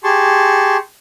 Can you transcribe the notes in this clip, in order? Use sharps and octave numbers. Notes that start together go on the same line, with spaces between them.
G4 G#4 A5 C6 C#6